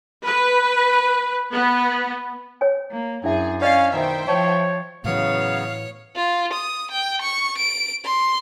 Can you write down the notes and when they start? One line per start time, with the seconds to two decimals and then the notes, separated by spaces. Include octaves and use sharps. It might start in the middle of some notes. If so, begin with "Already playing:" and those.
0.24 B4
1.53 B3
2.61 C#5 G#5
2.91 A#3
3.24 F#2 D4 E4 G#4 E5
3.62 C#4 D5 D#5 F5
3.92 B2 D#3 C5 E5 G5
4.28 F3 C#5 A5
5.04 A2 C#3 E3 F#3 B3 C#5 F5
6.16 F4
6.53 D#6
6.91 G5
7.22 C#6
7.58 D7
8.05 C6